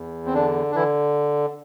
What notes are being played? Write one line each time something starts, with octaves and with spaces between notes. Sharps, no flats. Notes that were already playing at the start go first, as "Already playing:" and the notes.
Already playing: E2
C4
D3 D4
D4
D3 E3 E4